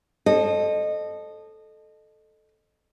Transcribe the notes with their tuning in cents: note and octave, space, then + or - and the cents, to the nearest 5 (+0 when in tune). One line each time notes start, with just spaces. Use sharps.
A4 -10 C5 +40 D#5 -25